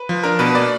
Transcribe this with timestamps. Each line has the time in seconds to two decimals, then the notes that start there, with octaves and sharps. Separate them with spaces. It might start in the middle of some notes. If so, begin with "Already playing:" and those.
Already playing: B4
0.09 F3
0.23 D4 A#4
0.39 B2 B4
0.54 A#3 D5